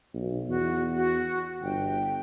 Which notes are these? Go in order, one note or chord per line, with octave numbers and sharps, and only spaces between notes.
B1
E2 F#4
F#4
G1 G5